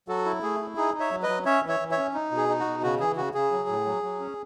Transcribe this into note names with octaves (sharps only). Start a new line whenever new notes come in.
F#3 F#4 A4
E4
A3 G#4
E4
D#4 G#4
D#4
C#5 E5
F#3
B4 D#5
F#3
C#4 C#5 E5
E3
C#5 E5
E3
C#5 E5
C#4
D#4
B2
G#4
D#4
F#4
B2
C#3 F#4
E3 G#4
C#3 F#4
C#3 G#4
F#3
A2
F#3
F#3
C#4